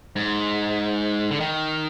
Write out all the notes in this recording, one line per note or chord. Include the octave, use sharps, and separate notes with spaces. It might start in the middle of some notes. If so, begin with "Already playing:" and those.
G#2
D3
D#3